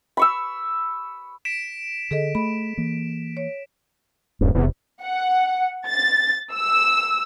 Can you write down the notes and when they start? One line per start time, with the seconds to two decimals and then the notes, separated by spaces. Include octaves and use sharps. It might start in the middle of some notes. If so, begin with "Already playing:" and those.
0.17 B5 C#6 E6
1.45 B6 D7 E7
2.11 D3 G#4 A4 D#5
2.35 A3 B5
2.77 E3 A#3
3.37 C#5
4.41 D#1 G2
4.55 E1 E2 C3
5.02 F#5
5.88 A6
6.55 E6